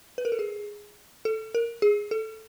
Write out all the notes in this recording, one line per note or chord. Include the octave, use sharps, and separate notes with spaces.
B4
A#4
A4
G#4
A4
A#4
G#4
A4